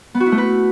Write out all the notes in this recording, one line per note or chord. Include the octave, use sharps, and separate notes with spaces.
B3
F#4
E4
A3
B4